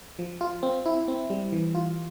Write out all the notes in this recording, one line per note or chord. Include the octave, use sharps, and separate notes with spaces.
F3
F4
C4
E4
C4
G3
E3
F4